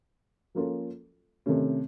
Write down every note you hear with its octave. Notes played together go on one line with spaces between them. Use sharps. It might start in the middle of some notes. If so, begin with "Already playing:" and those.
F3 A#3 C#4 F4 A4
C3 D#3 A3 C#4